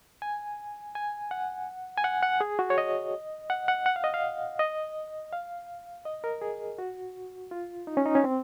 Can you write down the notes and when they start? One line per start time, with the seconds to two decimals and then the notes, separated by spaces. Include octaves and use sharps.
0.22 G#5
0.95 G#5
1.31 F#5
1.97 G#5
2.04 F#5
2.23 F#5
2.41 G#4
2.59 F#4
2.70 C#5
2.78 D#5
3.50 F#5
3.68 F#5
3.86 F#5
3.96 F5
4.04 D#5
4.14 F5
4.59 D#5
5.33 F5
6.05 D#5
6.24 A#4
6.41 G#4
6.78 F#4
7.51 F4
7.87 D#4
7.97 C#4
8.06 D#4
8.15 C#4
8.24 C4